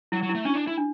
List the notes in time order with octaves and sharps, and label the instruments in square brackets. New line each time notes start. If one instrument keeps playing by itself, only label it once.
[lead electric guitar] F#3 [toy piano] E4
[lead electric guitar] F#3
[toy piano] E4
[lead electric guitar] A3
[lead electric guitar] C#4 [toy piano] D4
[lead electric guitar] D4
E4
[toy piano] D4